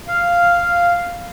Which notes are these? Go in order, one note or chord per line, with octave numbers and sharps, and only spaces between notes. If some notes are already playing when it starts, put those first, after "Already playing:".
F5